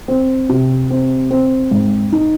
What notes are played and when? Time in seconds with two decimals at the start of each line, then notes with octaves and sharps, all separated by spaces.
0.08 C4
0.49 C3
0.90 C4
1.31 C4
1.71 G#2
2.12 D#4